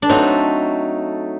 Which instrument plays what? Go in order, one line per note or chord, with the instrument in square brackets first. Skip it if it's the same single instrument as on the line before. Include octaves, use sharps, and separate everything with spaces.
[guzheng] D4
[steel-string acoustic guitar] F#3 A3 D#4 A4 [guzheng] C4